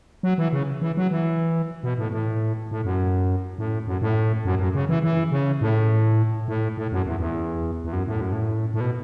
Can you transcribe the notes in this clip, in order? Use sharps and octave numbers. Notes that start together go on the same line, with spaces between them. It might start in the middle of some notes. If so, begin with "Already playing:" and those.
F#3
E3
C#3
E3
F#3
E3
B2
A2
A2
A2
F#2
A2
F#2
A2
F#2
F#2
C#3
E3
E3
C#3
A2
A2
A2
F#2
E2
E2
E2
F#2
A2
F#2
A2
A2
B2